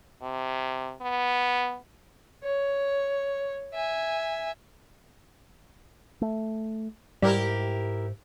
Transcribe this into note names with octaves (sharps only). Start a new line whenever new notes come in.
C3
B3
C#5
E5 G#5
A3
G#2 G3 E4 G4 A#4